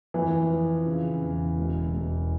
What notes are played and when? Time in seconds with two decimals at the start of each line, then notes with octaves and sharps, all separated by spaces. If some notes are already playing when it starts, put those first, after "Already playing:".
0.14 F2 E3
0.50 F3
0.86 C#3
1.22 E2
1.57 E1
1.93 E1